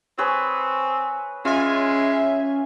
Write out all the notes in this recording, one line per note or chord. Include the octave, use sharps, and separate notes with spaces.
C4 G#4 B4 C#5
G#3 C#4 F4 E5 G#5